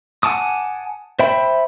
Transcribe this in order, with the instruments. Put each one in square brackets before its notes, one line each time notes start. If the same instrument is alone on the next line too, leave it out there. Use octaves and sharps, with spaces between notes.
[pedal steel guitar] F#5 G#5 A5 D6 D#6
C5 E5 G5 B5